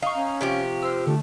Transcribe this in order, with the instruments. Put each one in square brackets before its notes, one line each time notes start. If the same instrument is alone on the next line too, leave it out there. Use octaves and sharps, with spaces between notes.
[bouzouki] D#4 [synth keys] F5 C#6
[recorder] C#4
[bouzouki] C3 F3 G4
[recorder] C5 [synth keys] E6 F6
[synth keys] D3 [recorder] A3